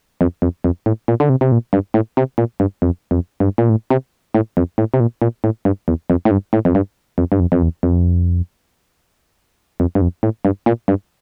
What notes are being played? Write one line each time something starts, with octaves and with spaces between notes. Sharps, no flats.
F2
F2
F2
A2
A#2
D3
C3
C3
A#2
G2
A2
C3
A#2
G2
F2
F2
G2
A#2
A2
C3
A2
F2
A2
C3
A#2
A#2
A2
G2
E2
F2
A2
G2
A2
F2
G2
F2
G2
F2
F2
E2
F2
F2
G2
F2
A2
G2
A#2
G2